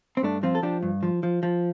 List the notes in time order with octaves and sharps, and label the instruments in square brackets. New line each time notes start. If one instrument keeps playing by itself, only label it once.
[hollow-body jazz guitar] C4
G2 A3 D4
F3 C4 F4
A4
F3 D4 G4
G2
F3
F3
F3